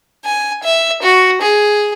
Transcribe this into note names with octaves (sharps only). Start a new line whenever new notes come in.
G#5
E5
F#4
G#4